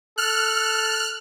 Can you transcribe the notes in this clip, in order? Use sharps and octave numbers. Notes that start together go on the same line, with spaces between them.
A4 F6 F#6